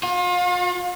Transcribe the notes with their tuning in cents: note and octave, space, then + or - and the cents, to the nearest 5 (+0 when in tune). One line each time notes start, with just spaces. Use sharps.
F4 +35